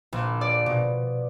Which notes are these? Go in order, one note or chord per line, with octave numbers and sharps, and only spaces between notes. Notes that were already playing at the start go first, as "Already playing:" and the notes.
A#1
D5
B2